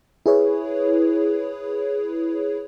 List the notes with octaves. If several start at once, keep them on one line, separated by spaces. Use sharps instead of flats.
E4 G#4 B4 C#5